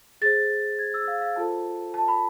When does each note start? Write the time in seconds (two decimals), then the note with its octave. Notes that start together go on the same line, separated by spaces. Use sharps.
0.21 G#4 C5 A6
0.79 G#6
0.94 E6
1.08 F5
1.22 F5
1.36 F4 A4 C5 A5
1.94 A5
2.08 B5